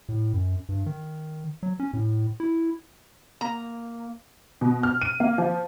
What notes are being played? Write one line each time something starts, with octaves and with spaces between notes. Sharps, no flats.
A2
F#2
G2
D#3
F#3
C#4
A2
E4
A#3 A#5
B2
F6
D#7
A#3
F3